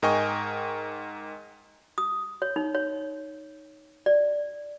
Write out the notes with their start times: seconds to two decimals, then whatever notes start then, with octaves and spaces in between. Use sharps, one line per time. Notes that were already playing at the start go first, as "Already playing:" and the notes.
0.02 G#2 A#4 D#5 G5 G#5 C#6
1.98 D#6
2.42 C#5
2.56 D#4
2.75 C#5
4.06 D5